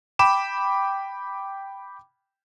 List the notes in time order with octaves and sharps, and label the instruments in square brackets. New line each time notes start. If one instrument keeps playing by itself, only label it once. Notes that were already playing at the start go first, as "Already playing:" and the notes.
[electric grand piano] G5 B5 D6 E7